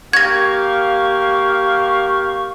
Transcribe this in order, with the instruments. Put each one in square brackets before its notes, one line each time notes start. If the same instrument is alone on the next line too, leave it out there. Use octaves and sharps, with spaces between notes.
[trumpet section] A#3 G4 F5 [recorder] C#6 [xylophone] G#6 A#6